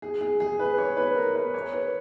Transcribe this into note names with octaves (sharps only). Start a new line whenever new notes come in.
G#4
G#4
G#4
B4
C#5
B4
A#4
B4
C#5
B4